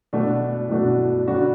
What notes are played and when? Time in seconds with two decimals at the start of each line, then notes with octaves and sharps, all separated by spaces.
0.13 B2 A3 D4 F#4
0.69 B2 A3 D4 F#4
1.27 D3 G3 D4 F#4